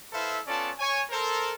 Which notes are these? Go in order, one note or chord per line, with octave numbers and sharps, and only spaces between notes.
E4 A4 B4 C5 E5 F5
B3 C#4 F4 A4 D5 A5
C#5 G#5
A4 A#4 C5